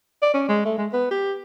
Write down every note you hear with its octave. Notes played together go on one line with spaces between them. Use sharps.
D5
C#4
G#3
A3
G#3
B3
G4